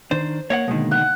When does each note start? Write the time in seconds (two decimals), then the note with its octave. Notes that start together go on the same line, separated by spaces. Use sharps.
0.11 D#3 D4 C5
0.50 A#3 C#5 D#5 F#5
0.68 B2 D3 D#3 G#3 A#3
0.91 F#5